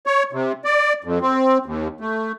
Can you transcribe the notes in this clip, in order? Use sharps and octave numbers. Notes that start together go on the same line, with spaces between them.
C#5
C3
D5
F2
C4
D#2
A3